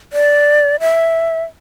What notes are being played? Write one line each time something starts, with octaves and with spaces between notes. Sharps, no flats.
D5
E5